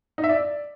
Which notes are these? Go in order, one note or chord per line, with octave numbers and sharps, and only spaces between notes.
D#4
E5
D5